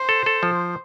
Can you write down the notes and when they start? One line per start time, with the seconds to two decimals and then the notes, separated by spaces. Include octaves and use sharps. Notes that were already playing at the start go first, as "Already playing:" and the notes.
Already playing: C5
0.09 A4
0.26 A4
0.43 F3